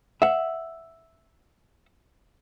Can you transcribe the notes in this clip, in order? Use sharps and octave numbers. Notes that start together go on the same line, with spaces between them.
E5 F#5